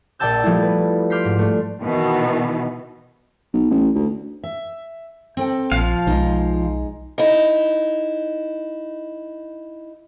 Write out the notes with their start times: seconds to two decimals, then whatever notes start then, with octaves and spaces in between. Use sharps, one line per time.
0.19 A#1 D5 G5 A5 E6 G6
0.43 F3 G3 A3 E4
0.62 B4
1.10 C6 D6 F6 G6 B6 C7
1.25 G#2
1.39 A3 D4
1.82 B2 D#3 E3 B3
3.53 B1
3.70 A1
3.95 D2
4.44 E5
5.37 C4 A4 G5
5.72 A#1 F3 F5
6.07 B1 G#3 D#4
7.18 D#4 E4